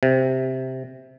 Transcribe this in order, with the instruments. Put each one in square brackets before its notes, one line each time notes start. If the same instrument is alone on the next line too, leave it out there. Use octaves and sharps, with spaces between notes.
[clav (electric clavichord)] C3